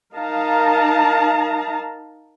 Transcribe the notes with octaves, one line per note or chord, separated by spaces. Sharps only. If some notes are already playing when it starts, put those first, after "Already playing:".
D#4 A#4 F5 A5 A#5